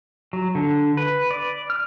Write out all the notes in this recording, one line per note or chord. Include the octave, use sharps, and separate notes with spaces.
F#3
D3
B4
D5
F6